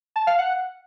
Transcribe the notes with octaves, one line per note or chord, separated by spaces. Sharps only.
A5
F5
F#5